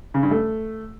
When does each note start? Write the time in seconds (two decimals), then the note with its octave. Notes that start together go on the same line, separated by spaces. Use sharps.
0.14 C#3
0.23 G2
0.31 A3